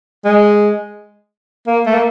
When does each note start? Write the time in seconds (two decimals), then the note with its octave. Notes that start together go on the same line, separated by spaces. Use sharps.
0.25 G#3
1.67 A#3
1.86 A3
1.94 A#3